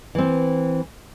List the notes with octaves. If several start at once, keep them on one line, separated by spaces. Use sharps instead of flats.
E3 C4